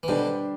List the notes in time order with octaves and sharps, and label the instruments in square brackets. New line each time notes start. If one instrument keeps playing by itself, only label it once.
[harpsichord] E3
[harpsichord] B2 D3 [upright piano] G3 D4 G4 C5